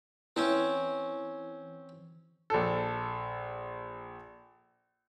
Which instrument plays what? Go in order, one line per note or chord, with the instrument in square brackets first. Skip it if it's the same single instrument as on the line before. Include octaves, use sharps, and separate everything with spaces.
[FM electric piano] E3 [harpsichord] C4 C#4
[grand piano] A#1 A4